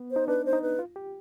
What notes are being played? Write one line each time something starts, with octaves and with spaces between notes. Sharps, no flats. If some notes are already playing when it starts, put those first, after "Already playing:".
Already playing: B3
C5
D#4
D4 B4
C5
D#4
B4
F4
G4